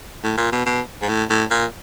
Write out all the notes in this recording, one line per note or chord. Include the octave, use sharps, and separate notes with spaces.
A2
A#2
B2
B2
G#2
A2
A2
A#2